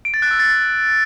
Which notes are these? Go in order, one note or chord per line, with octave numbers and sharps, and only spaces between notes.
D7
A6
F#6
E6
A6